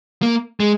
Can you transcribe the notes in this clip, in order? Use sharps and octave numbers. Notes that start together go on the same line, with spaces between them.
A#3
G#3